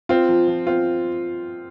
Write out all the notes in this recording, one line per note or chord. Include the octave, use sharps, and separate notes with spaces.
C4 F4
F3
F3
C4 F4